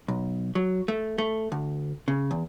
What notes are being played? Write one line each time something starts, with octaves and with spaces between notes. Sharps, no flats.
B1
F#3
A3
A3
D2
C#3
E2